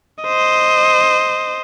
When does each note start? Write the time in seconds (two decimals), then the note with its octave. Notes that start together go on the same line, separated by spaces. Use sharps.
0.23 C5 D#5